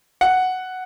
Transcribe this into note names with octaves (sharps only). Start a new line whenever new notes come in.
F#5